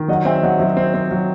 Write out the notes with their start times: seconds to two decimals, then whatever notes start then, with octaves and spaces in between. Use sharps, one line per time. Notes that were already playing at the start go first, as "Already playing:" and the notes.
Already playing: D#3
0.08 F#3 D#5 F#5
0.25 C4 E5 G5
0.43 F#3 D#5 F#5
0.59 F#3 C5 E5
0.77 C4
0.94 C4
1.11 F#3